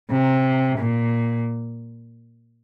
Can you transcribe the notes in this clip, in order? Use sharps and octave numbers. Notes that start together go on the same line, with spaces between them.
C3
A#2